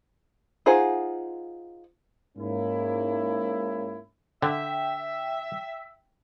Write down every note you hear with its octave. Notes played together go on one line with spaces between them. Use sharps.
D#4 F4 G#4 C5 F#5
G#2 A#3 C#4 E4
D3 E5 G5